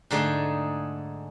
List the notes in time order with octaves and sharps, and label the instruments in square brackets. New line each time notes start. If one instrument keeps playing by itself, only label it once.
[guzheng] G#2 D3 A3 D#4 G#4